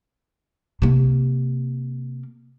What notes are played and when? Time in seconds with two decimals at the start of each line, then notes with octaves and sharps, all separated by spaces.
0.82 C3 A#3